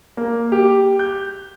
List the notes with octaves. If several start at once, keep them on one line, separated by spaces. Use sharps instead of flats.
A#3
G4
G6